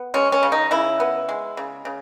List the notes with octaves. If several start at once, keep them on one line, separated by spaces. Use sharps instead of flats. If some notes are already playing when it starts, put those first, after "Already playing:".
Already playing: B3
G#3 C#4
C#4
C#3
D#4
C#3 E4
B3
G#3
C#3
C#3